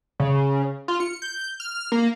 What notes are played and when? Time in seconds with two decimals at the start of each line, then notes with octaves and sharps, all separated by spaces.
0.20 C#3
0.88 F4
1.00 C#7
1.22 G6
1.60 F6
1.92 A#3